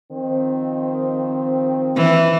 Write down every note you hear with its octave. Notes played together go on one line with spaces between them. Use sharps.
D#3 F3 C4
E3